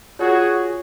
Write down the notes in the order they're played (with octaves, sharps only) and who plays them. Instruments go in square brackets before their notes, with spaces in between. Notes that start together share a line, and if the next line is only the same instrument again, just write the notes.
[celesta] F4 C#5 [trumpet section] F#4 G#4